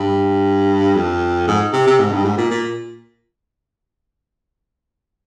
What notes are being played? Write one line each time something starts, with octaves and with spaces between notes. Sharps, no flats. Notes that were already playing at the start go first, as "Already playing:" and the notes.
Already playing: G2
F2
G#2
C3
C3
G#2
G2
G#2
A#2
A#2